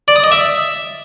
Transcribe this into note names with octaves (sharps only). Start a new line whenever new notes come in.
D5
D#6
D#5
E5